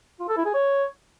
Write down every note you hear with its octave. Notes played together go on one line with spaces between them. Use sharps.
F4
A4
E4
G#4
C#5